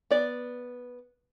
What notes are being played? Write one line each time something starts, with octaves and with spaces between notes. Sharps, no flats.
B3 D5